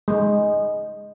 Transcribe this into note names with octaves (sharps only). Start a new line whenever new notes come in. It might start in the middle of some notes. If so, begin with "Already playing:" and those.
G#3